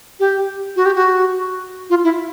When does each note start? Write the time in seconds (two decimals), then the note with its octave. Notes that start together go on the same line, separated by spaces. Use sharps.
0.20 G4
0.76 F#4
0.86 G4
0.95 F#4
1.90 F4
2.04 E4